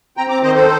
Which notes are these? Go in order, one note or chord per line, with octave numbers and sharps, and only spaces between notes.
C4 G5 A#5
A#5 D6
D#3 C5 D#5
A4 C5